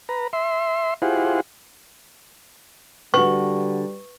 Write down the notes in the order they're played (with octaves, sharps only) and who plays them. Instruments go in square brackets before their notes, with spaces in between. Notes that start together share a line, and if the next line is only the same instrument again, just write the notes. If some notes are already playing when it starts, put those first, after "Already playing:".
[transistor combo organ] B4 A#5
E5 C6
E4 F4 G4 G#4 C5 F#5
[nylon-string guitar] D3 F#4 [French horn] G3 [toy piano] B4 C#6